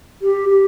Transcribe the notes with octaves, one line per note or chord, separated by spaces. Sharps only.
G4
G4